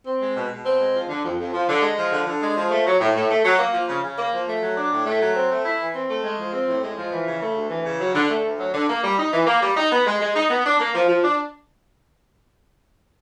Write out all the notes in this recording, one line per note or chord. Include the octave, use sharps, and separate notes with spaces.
C4
G#3
B2
B2
C4
G#3
F3
D3
F2
F2
F3
D3
G#3
F3
D3
D3
G#3
F3
A3
F#3
A2
A2
A3
F#3
A#3
F3
C#3
C#3
A#3
F3
A3
F#3
D4
A2
A3
F#3
C4
A3
E4
E3
C4
A3
G#3
F3
C4
A2
G#3
F3
E3
C#3
A3
D2
E3
C#3
F#3
D3
A3
D2
F#3
D3
A#3
G3
D#4
E3
A#3
G3
D#4
B3
G#3
G#3
D#4
B3
D4
A#3
F3
F3
D4